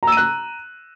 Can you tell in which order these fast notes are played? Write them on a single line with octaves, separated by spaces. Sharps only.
A#5 E6 D#7 F#6